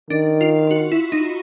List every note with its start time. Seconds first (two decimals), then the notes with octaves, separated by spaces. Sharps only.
0.10 D#3 D4
0.41 F4
0.71 F#4
0.92 E4
1.12 D#4